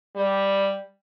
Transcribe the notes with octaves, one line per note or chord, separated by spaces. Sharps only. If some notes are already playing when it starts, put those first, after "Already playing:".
G3